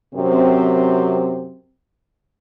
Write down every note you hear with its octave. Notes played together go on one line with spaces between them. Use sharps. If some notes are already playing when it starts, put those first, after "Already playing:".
F#2 C3 C4